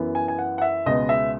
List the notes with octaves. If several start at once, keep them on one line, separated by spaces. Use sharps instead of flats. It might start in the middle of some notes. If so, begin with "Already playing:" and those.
Already playing: F#2 E3 B3
G#5
G#5
F#5
F#5
E5
C#2 B2 G#3 B3 D#5
E5